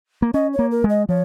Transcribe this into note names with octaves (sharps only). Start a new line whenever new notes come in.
A#3
C#4 D#5
C#5
A#3
A#4
G#3
D#5
F3 C#5